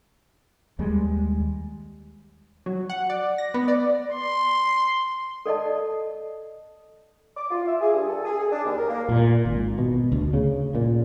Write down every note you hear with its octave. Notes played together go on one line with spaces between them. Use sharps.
D#2 G3 G#3
F#3
F#5
D5
A#6
B3
D5
C6
A4 D5 D#5 A5
D6
F4
E5
G#4
G2
A4
G#4
G#4
D4
D#2
A#4
A#3
A#2
G#1
B2
D2
C#3
A#2